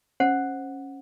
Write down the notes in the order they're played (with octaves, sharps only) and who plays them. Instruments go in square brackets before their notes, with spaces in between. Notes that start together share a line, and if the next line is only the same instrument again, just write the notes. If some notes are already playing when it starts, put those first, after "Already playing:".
[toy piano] C#4 C5 F#5